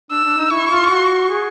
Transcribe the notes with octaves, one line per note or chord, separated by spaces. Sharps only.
D4 E6
D4
D#4
E4 C#6
F4
F#4
G#4